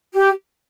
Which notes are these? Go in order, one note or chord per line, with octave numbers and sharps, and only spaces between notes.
G4